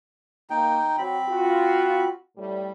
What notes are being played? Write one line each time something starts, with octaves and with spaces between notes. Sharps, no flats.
A#3 D#4 G5
F#3 C4 B5
F4 F#4
A2 G3